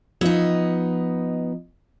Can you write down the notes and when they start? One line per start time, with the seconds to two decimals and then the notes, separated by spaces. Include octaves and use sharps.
0.21 F3 B3 D#4 F4 D#5